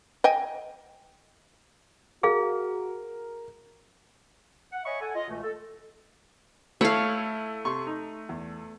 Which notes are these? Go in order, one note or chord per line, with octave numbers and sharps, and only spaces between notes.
D#5 G5 G#5
F#4 G#4 A#4 F5
F#5
C#5 D#5 E5 G#5 B5 C#6
A4 F#5 G#5
F4 D#5
C#2 B2 E3 A3
A4
A3 E4 C#5 F5 A5 E6
C3 C6 C#6
D#4
E2